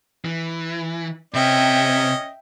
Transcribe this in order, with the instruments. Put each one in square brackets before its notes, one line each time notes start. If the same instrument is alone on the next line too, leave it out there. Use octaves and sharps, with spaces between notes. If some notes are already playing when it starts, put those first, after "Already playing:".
[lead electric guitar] E3
[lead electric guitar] C3 [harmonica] C#4 D#5 [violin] E5 G5